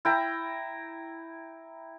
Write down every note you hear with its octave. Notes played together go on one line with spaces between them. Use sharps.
E4 G5 A#5